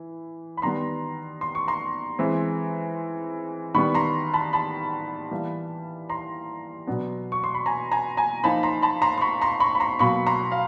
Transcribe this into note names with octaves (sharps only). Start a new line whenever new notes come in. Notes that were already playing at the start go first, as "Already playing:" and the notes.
Already playing: E3
B5
D#3 G3 B3 A#5 C6
C6
C#6
A#5 C6
E3 G#3 C4
D#3 G3 B3 B5 C#6
A#5 C6
A5 B5
A5 B5
E3 G3 A#3
A#5 C6
B2 F#3 B3 D4
C#6
C6
B5
G#5 A#5
G#5 A#5
G#5 A#5
F3 A#3 D#4 A5 B5
A#5 C6
A5 B5
A#5 C6
C6
B5 C#6
A#5 C6
B5 C#6
B5
A#5 C6
B2 F#3 A#3 B5 C#6
A#5 C6
F5